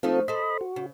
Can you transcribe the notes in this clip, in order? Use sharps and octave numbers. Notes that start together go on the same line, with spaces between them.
F3 A3 C4 D#4 F4 A4
A4 C5 D#5 B5
F#4
C#3